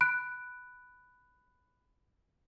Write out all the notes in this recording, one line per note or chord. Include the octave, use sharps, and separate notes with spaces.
B5 F#6 D7